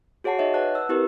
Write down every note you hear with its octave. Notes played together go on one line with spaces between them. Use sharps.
F#4 G#4 C#5 F#5 A5 C7
D#4 C#5 D#5 E5
B4 D5 F#5 A5 F#6
E6
C4 E4 G4 A#4 B4